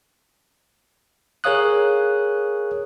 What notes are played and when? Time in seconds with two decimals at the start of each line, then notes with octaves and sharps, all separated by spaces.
1.44 G#4 A#4 C#5 F5 D#6 F#6